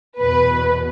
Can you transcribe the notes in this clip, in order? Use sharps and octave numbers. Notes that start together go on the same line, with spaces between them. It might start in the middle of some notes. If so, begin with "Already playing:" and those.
E2 B2 B4